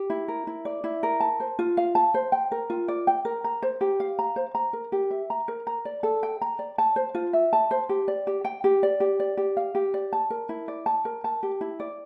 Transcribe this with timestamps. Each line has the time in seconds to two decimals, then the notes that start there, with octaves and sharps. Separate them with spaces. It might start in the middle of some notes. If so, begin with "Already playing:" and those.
Already playing: G4
0.10 E4
0.28 A#4
0.47 E4
0.65 D5
0.84 E4
1.03 A#4
1.20 A5
1.40 C5
1.59 F4
1.77 F5
1.95 A5
2.14 C5
2.32 G5
2.52 A#4
2.70 F4
2.88 D5
3.07 G5
3.25 A#4
3.44 A#5
3.62 C5
3.81 G4
4.00 F5
4.19 A#5
4.36 C5
4.55 A#5
4.73 A#4
4.92 G4
5.11 E5
5.30 A#5
5.48 A#4
5.67 A#5
5.85 D5
6.03 A4
6.23 G5
6.41 A#5
6.59 D5
6.78 A5
6.96 C5
7.15 F4
7.33 E5
7.53 A5
7.71 C5
7.89 G4
8.08 D5
8.27 G4
8.45 G5
8.64 G4
8.83 D5
9.00 G4
9.20 D5
9.37 G4
9.57 F5
9.75 G4
9.94 D5
10.13 A5
10.30 A#4
10.49 E4
10.68 D5
10.86 A5
11.05 A#4
11.24 A5
11.43 G4
11.61 E4
11.80 D5